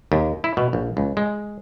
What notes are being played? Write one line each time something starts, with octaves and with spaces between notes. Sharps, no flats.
D#2
E4
B2
A#1
C#2
G#3